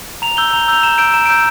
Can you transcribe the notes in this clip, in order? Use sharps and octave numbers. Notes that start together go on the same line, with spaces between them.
A#5 F7
E6 G6 G7
A#5 F7
E6 G6 F7
A#5 E7
E6 G6 D7
A#5 E7
E6 G6 D7